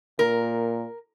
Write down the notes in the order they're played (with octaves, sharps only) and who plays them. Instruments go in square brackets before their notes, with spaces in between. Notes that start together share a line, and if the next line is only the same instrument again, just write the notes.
[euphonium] A#2 [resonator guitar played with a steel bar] A#4